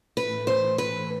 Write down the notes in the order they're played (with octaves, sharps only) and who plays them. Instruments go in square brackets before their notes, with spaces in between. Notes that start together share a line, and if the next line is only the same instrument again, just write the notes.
[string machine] A2 E3 A3 [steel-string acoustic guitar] B4
[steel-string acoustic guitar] C5
B4